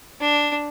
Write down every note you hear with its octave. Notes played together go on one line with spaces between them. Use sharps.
D4